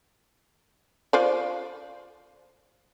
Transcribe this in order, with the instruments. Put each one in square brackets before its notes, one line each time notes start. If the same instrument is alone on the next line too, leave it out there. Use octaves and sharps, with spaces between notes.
[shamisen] F4 C5 D5